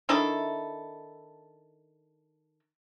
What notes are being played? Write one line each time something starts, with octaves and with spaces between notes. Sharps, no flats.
D#3 D4 E4 A4